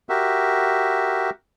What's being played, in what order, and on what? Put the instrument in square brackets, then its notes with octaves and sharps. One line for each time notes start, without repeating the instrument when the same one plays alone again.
[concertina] F#4 G4 A#4 E5